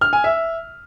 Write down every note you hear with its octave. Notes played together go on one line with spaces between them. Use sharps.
F6
G#5
E5